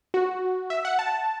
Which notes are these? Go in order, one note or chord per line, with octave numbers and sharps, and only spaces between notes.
F#4
E5
F#5
A5